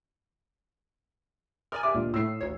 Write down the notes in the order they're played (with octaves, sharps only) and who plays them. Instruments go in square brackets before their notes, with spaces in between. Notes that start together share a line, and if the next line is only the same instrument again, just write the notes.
[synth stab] A#4 D5 G#5 [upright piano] D#6 F6
[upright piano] G4 E5 D6
[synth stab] C#2 [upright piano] A#2 D4
[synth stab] A2 A3 [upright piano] E6 C7
[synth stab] A1 D2 C#5